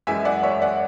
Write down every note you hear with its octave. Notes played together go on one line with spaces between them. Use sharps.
F#2 E3 G#3 E5 G#5
D5 F#5
C#5 E5
D5 F#5